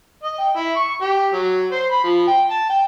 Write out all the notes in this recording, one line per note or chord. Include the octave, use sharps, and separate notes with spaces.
D#5
G5
E4
C#6
G4
F#3
C5
B5
F3
G5
A5
G5